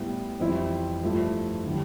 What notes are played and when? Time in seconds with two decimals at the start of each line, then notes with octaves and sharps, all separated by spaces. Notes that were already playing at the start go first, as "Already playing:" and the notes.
Already playing: A2 G3 B3 E4
0.40 F2 E3 G3 C4 E4
1.03 G2 F3 A3 E4
1.66 D3 G3